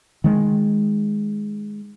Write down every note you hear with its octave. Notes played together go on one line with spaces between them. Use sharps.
D#3 G#3